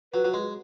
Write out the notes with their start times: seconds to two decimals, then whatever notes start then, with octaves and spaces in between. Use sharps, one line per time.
0.14 F#3 B4
0.25 F#3
0.34 G#3